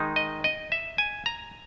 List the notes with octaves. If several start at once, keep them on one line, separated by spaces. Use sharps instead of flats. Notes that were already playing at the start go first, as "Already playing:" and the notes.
Already playing: D#3 G#3 D#4
D#5
D#5
E5
G#5
A#5